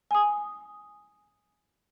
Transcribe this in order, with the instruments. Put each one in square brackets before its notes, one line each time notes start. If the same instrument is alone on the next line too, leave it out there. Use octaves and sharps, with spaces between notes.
[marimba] G#5 D#6